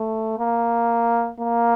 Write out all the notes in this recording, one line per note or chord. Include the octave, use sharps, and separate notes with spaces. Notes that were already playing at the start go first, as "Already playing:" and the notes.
Already playing: A3
A#3
A#3